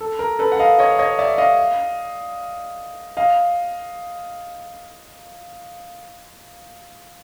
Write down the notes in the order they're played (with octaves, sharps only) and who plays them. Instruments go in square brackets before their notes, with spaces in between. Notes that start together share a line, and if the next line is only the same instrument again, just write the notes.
[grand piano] A4
A#4
A4 B4
F#5
D#5 F5
C#5 D#5
C#5 D#5
D5 E5
D#5 F5
D#5 F5